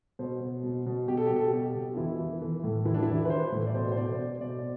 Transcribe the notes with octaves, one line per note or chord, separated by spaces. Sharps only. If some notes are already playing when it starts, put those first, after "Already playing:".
B2 C5
B2
B2
B2
B2 G4
A4
B2 G4
A4
G4
B2
B2
F4
E3 E4
E3
E3
A2
E3 E4
D4
E3 E4
B4
E3 C5
A2
D5
B2 C5
C5
B2 D5
B2 C5
B2 D5